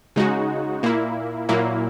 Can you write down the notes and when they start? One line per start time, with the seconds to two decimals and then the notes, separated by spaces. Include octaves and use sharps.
0.16 C#3 G#3 D#4 F#4
0.83 A#2 A#3 E4
1.49 A#2 F#3 A#3 E4